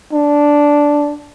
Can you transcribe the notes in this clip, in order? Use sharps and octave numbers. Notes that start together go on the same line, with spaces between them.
D4